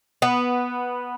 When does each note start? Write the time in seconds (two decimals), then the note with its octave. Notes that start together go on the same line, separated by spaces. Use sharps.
0.22 B3